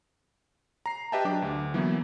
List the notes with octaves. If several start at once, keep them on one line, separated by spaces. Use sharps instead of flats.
A#5 C7
G4 B4 D#5 E5 G5 A5
F#3 D4 G4 D6
D2
E3 F#3 A#3 B3 E4